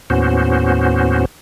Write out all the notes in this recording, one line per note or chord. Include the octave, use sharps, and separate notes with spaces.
D#2 A2 B3 C#4 F#4 C5